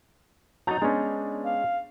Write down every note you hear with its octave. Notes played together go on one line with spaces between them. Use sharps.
F#3 D#4 A#5 G6 A6
G#3 B3 C#4 D4
F5